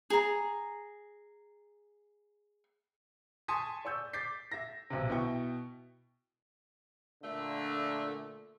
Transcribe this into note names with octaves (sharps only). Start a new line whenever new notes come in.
G#4 A#5
G#5 A5 C6 C#6 D#6 B6
D5 C#6 E6 G6
D6 G6 A6 B6 C7
E5 A#6
B1 C3
B2 E4 G5 C#6
A#2 D3 A3